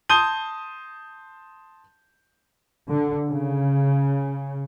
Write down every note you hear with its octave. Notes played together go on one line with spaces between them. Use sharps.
A5 C6 D#6 G6 D#7 G7
D3
C#3